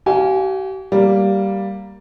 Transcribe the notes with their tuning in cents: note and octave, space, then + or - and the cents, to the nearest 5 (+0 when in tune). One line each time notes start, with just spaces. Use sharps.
G4 -45 F5 +0 G#5 +0
G3 -5 A#3 +0